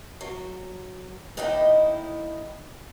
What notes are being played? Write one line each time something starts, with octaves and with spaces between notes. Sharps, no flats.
F#3
D#2 A2 D#4 E4 D#5 G5